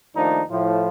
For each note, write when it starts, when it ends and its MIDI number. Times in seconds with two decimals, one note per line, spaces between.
0.15 0.41 39
0.15 0.41 51
0.15 0.41 53
0.15 0.41 57
0.15 0.41 62
0.15 0.41 63
0.50 0.89 45
0.50 0.89 53